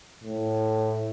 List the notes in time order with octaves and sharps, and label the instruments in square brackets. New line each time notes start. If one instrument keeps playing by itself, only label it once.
[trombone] A2